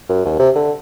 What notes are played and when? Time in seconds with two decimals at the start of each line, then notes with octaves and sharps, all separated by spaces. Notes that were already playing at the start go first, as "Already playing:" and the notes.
0.09 F#2
0.25 D#2
0.39 C3
0.55 D3